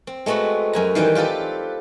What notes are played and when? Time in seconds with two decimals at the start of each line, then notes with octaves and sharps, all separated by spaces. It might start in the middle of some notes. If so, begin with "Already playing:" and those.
0.07 C4
0.26 G#3 A3 B3 C4 F#4
0.73 F#2 G#5 A#5
0.95 D#3 E3 G3 G5
1.15 C4 F4 G4 A4 B4